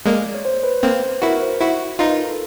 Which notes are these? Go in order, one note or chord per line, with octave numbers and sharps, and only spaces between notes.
G#3 A#3 D5
C#5
C5
B4
A#3 C4 C5
B4
E4 F#4 A#4
C5
E4 F#4
D#4 F4 B4
A#4
A4
A4